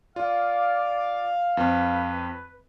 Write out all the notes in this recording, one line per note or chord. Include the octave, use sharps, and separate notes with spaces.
F4 D5 F5
F2 C4 B4